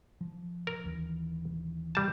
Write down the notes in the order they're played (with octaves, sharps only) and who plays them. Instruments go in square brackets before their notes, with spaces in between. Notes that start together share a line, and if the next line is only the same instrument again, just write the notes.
[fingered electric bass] F3
[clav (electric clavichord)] A#4
[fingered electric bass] D#1 D#2 E3
[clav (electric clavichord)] G3 A5